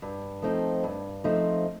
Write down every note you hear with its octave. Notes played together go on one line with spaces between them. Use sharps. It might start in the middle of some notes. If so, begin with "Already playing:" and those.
G2
F3 A3 C4 D#4
G2
F3 A3 C4 D#4